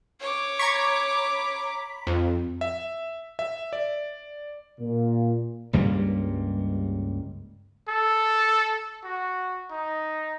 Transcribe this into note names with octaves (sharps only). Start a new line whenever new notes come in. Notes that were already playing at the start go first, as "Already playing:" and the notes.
C#5 D6
A#5 B5 C#6 G#6 B6
F2
E5
E5
D5
A#2
C#2 G2 G3 A#3
A4
F#4
D#4